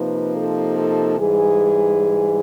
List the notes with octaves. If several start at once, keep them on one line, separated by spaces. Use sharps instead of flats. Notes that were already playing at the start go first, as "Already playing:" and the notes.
Already playing: C3 F3 A#3 D#4 B4
A4
A4
G#2 E3 G3 G#4